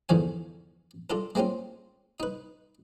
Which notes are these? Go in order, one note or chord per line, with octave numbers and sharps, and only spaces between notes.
E2 G#2 D3 F3 F5 G#5
D4 F4 A4 A#4
G#3 A#3 C4 C#4 F4
D#4 B4